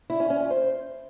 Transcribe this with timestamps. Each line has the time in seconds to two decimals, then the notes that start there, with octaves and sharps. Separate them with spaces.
0.10 E4
0.20 C#4
0.30 C#4
0.40 F4
0.51 C5